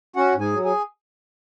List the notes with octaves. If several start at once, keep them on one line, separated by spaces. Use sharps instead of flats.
C#4 F#4 F#5
G#2
G#4 G#5
F#3
G#4 G#5